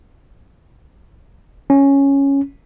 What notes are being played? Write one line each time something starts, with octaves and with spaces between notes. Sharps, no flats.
C#4